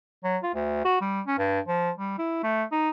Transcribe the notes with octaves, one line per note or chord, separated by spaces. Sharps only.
F#3
F4
D2
F#4
G3
C#4
G2
F3
G3
E4
A3
D#4